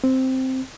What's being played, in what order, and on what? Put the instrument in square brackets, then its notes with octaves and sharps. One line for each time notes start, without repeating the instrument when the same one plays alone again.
[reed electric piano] C4